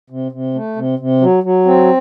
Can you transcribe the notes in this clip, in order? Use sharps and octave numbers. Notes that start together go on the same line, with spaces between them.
C3
C3
A3
C3
C3
F#3
F#3
C4